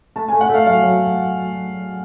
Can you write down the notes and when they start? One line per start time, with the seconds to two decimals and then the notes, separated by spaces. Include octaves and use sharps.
0.16 A3 A5
0.28 A3 G#5
0.41 F#5
0.49 A3 F5
0.66 F#3 F5
0.82 F#3